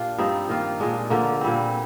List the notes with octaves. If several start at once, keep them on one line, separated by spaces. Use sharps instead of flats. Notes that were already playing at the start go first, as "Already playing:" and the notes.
Already playing: A#2 D4 F4 G4
G2 F3 C4 D#4
D#3 A#3 F4
A#2 G#3 D4
D3 F3 A#3
A#2 G3 C4